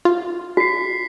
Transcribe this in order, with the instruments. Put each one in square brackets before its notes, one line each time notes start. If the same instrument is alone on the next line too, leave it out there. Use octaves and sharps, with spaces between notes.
[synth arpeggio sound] F4
[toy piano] F#4 [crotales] B6 C7